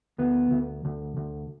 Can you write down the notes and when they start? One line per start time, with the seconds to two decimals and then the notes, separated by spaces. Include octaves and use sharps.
0.18 D2 B3
0.51 D2
0.85 D2
1.17 D2